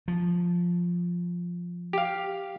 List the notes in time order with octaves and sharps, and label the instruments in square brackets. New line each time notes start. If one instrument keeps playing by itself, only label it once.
[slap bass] F3
[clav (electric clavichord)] G4 F5